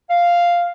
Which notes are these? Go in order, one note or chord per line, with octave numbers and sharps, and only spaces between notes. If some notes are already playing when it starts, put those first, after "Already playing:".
F5